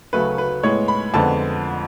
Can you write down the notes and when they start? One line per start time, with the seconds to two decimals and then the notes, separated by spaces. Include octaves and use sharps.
0.13 D2 C#3 F#3 A3 B4
0.38 B4
0.63 A2 G#3 B3 C#5
0.88 B5
1.14 F2 D3 G#3 B3 A5